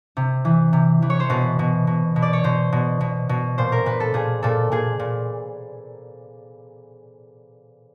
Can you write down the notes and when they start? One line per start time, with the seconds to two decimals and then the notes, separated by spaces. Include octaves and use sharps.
0.17 C3
0.45 E3
0.73 C3
1.02 E3
1.10 C#5
1.20 C5
1.30 B2 B4
1.59 B2
1.87 B2
2.16 B2
2.22 D5
2.33 C#5
2.44 B2 C5
2.73 B2
3.01 B2
3.29 B2
3.58 A#2 C5
3.72 A#4
3.86 A#2 B4
4.00 A4
4.14 A#2 G#4
4.43 A#2 A4
4.72 A#2 G#4
4.99 A#2